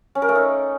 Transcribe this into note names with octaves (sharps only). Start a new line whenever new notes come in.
C#4
A#4
A3
D#4